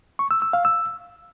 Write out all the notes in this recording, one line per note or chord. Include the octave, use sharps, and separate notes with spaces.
C#6
E6
E6
F5
E6